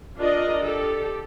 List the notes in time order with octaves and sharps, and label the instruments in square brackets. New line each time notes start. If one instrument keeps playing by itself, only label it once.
[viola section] D4 F4 A#4 D5 D#5
G4 A4